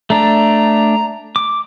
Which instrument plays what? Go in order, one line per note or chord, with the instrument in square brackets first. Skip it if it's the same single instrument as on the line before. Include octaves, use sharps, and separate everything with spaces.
[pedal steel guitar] A3 D4 [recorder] A#5
[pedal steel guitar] D6